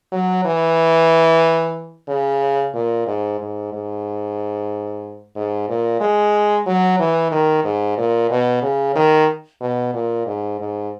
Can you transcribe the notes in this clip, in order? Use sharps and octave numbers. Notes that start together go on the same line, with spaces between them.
F#3
E3
C#3
A#2
G#2
G#2
G#2
G#2
A#2
G#3
F#3
E3
D#3
G#2
A#2
B2
C#3
D#3
B2
A#2
G#2
G#2